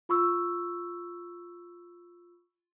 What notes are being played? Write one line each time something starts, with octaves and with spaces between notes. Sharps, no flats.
F4 B5 C#6 E6